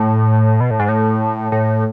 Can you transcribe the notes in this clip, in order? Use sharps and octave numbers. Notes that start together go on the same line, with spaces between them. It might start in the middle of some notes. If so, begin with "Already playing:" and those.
Already playing: A2
B2
A2
G#2
A2
A2